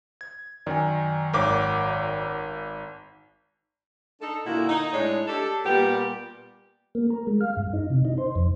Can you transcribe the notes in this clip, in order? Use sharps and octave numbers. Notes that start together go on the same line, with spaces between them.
G#6
F#2 D#3 D5 G#5
G#1 A#4 C#5 F#5 D6
D4 D#4 A4
A#2 D3 A#3 E4 F#4
D#4
A2 G#3 D4 C#5
D4 G4 A4
A#2 G3 B3 G4
A#3
A#4
G#3
F5
G2
D#4
C3
D#4
C5
F2